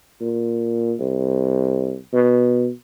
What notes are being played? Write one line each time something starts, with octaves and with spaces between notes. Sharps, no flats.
A#2
C2
B2